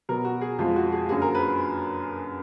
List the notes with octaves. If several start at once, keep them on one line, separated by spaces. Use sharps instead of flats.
B2 F#3 B3 A#4
F#4
G#4
F2 F3 G#3 F4
F#4
G#4
F#2 D3 F#3 A#3 G#4
A#4
B4